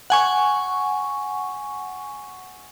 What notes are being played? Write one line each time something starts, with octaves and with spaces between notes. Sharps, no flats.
F#5 G#5 C#6